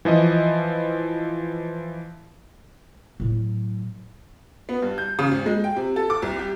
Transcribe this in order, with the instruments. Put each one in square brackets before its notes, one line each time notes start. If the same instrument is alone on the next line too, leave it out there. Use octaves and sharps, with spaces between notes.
[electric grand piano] E3 F3 E4 D#5
[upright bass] A2 F#3
[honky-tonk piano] B3
G2
G6
C#3
G#1
G#3
G5
C3
A4
D6
C2
G4